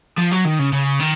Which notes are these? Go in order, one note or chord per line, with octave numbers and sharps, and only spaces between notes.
F3
F#3
D#3
C#3
C#3
D#3